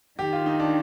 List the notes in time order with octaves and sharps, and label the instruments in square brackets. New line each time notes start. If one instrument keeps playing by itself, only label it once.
[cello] D#3 [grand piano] G4
[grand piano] F4
D#4
D4